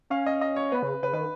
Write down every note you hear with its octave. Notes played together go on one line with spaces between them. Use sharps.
C#4 F5
D#5
D#5
C#5
B3 B4
C#3
C#3 B4
D#3 B4